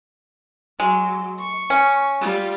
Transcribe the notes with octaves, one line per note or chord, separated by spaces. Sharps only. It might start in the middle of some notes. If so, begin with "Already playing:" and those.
F#3 G#3
C#6
C#4
G3 F4